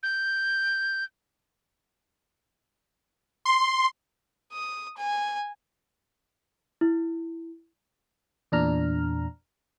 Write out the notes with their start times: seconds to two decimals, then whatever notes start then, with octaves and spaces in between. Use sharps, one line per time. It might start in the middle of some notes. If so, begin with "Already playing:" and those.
0.03 G6
3.45 C6
4.52 D#6
4.97 G#5
6.81 E4
8.52 E2 A#2 D4 A#5 F6